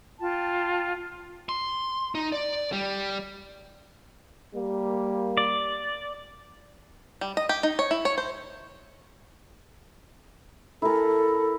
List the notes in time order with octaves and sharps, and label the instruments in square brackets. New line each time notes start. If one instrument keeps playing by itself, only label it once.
[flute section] F4 G5 A5
[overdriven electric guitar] C6
D#4
D5
G3
[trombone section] G3 A#3
[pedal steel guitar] D5
[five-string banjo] G3
D#5
G4
D#4
C#5
E4
C#5
C5
[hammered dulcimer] E4 A#4 [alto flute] A4